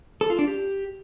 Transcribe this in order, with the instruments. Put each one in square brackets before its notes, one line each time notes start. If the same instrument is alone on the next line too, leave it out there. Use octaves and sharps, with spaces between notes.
[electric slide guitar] A4
F4
D4
G4